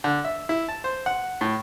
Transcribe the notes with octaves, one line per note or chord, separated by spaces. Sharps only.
D3
E5
E4
A5
C5
F#5
A2